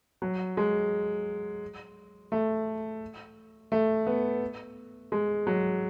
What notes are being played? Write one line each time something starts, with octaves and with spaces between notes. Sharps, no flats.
F#3
G#3
A3
A3
B3
G#3
F#3